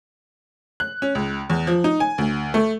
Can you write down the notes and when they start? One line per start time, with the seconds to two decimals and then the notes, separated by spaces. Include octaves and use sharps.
0.80 F#6
1.02 C#4
1.15 C#2
1.50 E2
1.67 F3
1.84 D#4
2.00 G#5
2.18 D2
2.54 A3